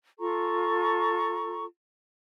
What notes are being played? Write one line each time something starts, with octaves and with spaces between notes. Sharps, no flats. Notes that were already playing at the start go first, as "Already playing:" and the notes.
F4 A4 A#5 C#6